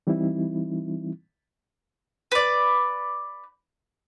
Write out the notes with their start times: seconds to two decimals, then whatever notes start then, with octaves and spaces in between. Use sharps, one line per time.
0.07 E3 G3 C4 D#4 E4
2.32 B4 D5